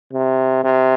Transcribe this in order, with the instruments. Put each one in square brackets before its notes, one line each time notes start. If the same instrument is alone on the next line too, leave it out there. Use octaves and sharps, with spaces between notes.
[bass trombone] C3
C3